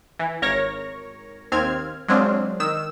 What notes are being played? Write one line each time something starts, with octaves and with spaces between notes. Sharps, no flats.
E3
G#1 A#4 C#5 A#6
D#2 C4 F6 G#6
F#3 G#3 C4 D4 F4
D#3 E6 E7